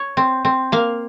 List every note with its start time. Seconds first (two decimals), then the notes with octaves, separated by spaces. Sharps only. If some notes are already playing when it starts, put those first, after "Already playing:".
Already playing: C#5
0.17 C4
0.45 C4
0.72 A#3 F5